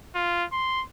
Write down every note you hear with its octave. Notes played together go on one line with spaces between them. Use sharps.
F4
C6